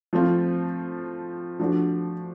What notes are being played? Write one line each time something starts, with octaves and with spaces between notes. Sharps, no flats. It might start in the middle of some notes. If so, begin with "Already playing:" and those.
F3 A3 C4 F4
F3 A3 D4 F#4